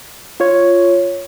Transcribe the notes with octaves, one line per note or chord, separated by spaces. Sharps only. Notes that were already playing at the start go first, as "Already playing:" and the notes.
F4 C#5